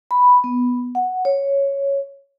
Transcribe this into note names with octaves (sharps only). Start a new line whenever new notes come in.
B5
B3
F#5
C#5